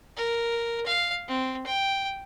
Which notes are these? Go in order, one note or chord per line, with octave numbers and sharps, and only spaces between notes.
A#4
F5
C4
G5